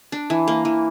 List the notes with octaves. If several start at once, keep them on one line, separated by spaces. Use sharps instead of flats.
D4
E3
A#3
E3